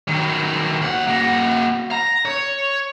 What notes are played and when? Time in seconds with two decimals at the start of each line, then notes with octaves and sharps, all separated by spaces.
0.08 D#3 F#3
0.82 D#2 F#5
1.07 A#3 F#4
1.91 A#5
2.25 C#5